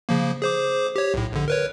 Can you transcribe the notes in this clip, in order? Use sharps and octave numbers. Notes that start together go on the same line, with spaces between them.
C#3 F3 A#3
G#4 C5 D6
G4 C#5
B1 A2
A#1 D3
A#4 B4 C#5